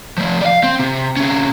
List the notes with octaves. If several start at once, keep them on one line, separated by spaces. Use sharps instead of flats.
F3 A3
D5 F5
C4
C3
C3 C#4